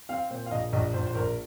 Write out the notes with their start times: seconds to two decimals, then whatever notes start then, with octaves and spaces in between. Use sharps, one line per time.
0.09 C4 F5
0.30 A#2 C5
0.46 F5
0.51 A#1 D#5
0.73 A#1 D#5
0.93 A#1 C5
1.07 C5
1.15 A#1 A#4